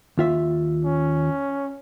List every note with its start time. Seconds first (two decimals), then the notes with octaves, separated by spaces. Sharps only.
0.18 D#2 F4 E5
0.85 C#4